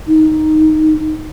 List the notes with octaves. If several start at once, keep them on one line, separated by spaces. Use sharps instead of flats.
D#4